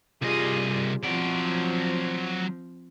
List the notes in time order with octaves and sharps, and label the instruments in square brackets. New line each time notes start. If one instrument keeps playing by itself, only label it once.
[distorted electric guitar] C2 D#5 [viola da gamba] G3 F4 G#4
[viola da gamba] F3 C4 [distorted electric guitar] F#3 D5